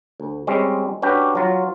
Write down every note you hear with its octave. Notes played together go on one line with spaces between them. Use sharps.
D2
G3 G#3 C4 C#4
C#4 D4 F#4 G4 B4 G5
F#3 F4